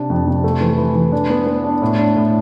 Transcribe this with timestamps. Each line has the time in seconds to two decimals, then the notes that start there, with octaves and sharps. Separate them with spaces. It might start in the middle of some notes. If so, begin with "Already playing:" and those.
Already playing: C3 D4
0.10 F2
0.27 C3
0.44 A3
0.61 E3
0.78 E3
0.95 E3
1.12 D4
1.30 B3
1.47 B3
1.64 D4
1.82 A2
1.98 D4
2.16 A2